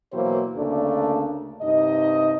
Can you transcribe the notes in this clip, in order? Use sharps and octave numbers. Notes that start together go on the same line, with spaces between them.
B2 E3 F#3 A#3 C5
D2 C#3 A3 A#3 D4
G2 C3 D#4 D#5